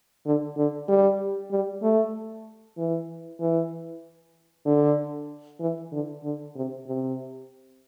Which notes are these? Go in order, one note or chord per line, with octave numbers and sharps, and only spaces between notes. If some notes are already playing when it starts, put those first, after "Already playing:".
D3
D3
G3
G3
A3
E3
E3
D3
E3
D3
D3
C3
C3